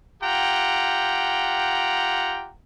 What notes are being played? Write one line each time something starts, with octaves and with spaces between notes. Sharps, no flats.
F4 G4 F#5 G5 A#5